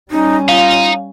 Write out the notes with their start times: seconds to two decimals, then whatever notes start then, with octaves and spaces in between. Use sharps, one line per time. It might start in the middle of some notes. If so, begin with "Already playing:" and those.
0.11 G3 C#4 D#4
0.49 D#4 F4 F5